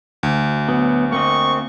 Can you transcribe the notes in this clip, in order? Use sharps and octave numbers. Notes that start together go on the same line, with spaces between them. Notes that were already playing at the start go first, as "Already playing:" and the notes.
D2
F#3 B3
A#3 C4 D#5 C#6